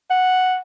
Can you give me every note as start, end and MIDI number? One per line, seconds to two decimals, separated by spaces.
0.10 0.56 78